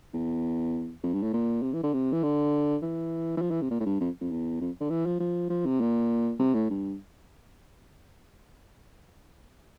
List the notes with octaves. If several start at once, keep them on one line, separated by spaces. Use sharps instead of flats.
E2
F2
G2
A2
A#2
C3
E3
D3
C3
E3
D3
E3
E3
F3
E3
C3
A#2
A2
G2
F2
F2
E2
F2
D3
E3
F3
F3
F3
C3
A#2
C3
A2
G2